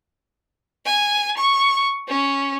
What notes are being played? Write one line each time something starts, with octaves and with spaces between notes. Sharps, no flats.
G#5
C#6
C#4